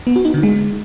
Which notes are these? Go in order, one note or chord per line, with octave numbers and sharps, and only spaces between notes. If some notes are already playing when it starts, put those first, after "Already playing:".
B3
F#4
D#4
D3
G#3